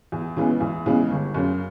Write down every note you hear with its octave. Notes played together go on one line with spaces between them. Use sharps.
E2
C#3 E3 G#3 B3
E2
C#3 E3 G#3 B3
G1
F#2 C#3